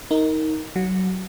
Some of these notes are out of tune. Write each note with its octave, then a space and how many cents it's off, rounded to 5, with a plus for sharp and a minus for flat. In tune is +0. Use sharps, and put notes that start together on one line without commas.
D#4 +20 A#4 -10
F#3 +20 F#5 -25